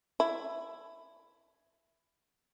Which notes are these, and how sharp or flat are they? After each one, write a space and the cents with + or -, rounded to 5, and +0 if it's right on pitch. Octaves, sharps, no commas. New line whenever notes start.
E4 +15